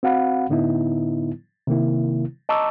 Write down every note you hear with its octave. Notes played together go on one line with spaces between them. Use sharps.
C4 F#4 F5 F#5 B5
A2 D3 B3 D#4 E4
C3 D#3 A#3 E4
D#5 A5 A#5 C#6 D6 E6